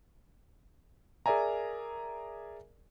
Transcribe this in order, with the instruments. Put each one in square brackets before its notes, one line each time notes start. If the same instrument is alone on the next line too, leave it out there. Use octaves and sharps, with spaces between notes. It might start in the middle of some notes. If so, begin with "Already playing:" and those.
[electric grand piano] G#4 A#4 D5 E5 G#5 A#5